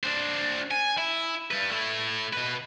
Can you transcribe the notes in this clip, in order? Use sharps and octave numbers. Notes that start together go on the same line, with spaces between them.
D4 C5
G#5
E4
G3 B4
A3 E4
B2 B4